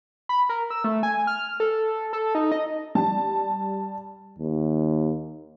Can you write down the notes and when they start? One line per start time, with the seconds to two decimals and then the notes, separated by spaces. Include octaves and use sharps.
0.29 B5
0.49 A#4
0.70 E6
0.84 A3
1.03 G#5
1.27 F6
1.60 A4
2.13 A4
2.35 D#4
2.52 D#5
2.95 G3 A5
4.38 D#2